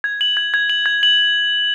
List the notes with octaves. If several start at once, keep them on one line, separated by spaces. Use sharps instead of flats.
G#6
F#7
G#6
G#6
F#7
G#6
F#7